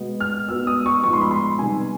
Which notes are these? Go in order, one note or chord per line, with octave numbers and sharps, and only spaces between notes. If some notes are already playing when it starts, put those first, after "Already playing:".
Already playing: B2 G#3 B3
F6
B2 G#3 B3 E6
D#6
C#6
G#2 F3 G#3 B3 C#6
C6
B5
C6
C3 D#3 G3 B3 G#5